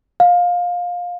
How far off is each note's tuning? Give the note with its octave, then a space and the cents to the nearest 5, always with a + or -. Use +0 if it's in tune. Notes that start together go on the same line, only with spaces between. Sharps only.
F5 +20